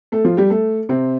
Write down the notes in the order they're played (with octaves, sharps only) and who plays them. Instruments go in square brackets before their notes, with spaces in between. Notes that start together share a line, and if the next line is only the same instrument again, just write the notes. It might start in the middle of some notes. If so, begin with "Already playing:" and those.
[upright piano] A3 A4
F3 F4
G3 G4
A3 A4
C3 C4